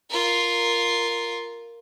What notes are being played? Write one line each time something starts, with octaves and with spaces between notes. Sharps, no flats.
F4 A#4